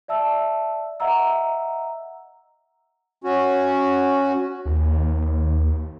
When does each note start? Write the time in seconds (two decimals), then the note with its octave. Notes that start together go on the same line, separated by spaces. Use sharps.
0.08 D5 E5 A5 E6
1.00 D#5 E5 F#5 A#5 E6
3.24 C#4 F#4
4.65 D#2